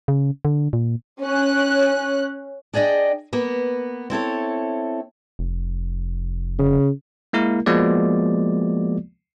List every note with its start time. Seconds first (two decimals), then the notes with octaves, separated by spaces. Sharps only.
0.08 C#3
0.45 D3
0.73 A#2
1.22 C#4 F#6
2.74 D4 G#4 D5 D#5 G5
3.33 A#3 B3
4.10 C4 E4 A4 C#5
5.39 F1
6.59 C#3
7.33 G#3 A#3 E4 A#4
7.66 F3 G#3 A#3 B3 F#4 D5